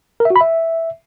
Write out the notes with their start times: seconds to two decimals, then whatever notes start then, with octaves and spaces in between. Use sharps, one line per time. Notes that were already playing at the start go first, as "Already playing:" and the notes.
0.20 A#4
0.25 E5
0.30 F#4
0.36 B5
0.41 E5